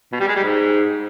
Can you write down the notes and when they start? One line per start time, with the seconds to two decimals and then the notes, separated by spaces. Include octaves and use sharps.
0.12 B2
0.20 G3
0.28 G#3
0.36 G3
0.43 G#2